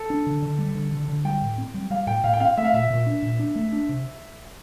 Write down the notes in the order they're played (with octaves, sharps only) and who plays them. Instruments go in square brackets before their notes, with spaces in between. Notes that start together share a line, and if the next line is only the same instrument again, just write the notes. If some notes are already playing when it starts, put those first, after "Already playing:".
Already playing: [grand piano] A4
[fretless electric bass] D4
D3
D3
G3
D3
D3
D3
[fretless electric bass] G3 [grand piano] G5
[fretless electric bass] A2
C4
G3
[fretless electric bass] G3 [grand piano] F5
[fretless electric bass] A2 [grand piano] G5
[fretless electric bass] A2 [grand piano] F5
[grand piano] G5
[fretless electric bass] C4 [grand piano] F5
[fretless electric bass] A3 [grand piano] E5
[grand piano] F5
[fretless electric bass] A#2 [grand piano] E5
[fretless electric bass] A#2
D4
A#2
D4
A3
D4
C3